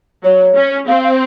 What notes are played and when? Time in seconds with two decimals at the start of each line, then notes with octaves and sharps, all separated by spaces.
0.24 F#3 C#5
0.56 C#4
0.88 C4 F5
1.04 F5